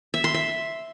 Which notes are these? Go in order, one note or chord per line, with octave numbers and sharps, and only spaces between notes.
E5
C6
E5